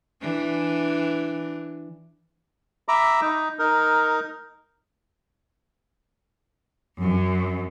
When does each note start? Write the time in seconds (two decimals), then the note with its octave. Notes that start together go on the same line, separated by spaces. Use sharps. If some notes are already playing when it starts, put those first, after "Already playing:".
0.22 E3 D4
2.88 E5 A#5 B5 D6
3.21 D#4
3.59 D#4 A#4
7.01 F#2